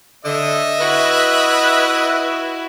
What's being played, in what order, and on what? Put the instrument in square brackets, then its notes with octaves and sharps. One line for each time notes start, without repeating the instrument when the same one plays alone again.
[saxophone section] D3 [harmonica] D#5 E5
[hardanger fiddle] E4 F#4 [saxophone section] B4